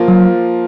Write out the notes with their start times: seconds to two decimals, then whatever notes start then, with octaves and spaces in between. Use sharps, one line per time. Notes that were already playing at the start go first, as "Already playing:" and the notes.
Already playing: F3 A#3 F4
0.08 F#3